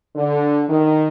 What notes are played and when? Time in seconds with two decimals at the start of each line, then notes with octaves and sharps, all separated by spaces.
0.16 D3
0.68 D#3